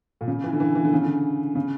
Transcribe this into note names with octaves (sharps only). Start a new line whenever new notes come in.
A#2
C#3
E3
D3
E3
E3
D3
C#3
D3
C#3